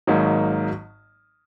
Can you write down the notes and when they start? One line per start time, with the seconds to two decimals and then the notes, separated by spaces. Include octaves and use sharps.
0.07 G#1 G#2 F#3 A#3 D#4